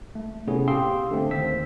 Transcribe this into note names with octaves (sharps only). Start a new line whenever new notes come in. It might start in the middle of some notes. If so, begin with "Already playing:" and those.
A3
A2 C3 B3 C#4 G#4 A4
G4 F5 G5 C6 D#6 E6
D3 A3 C4
D#2 C5 E6 B6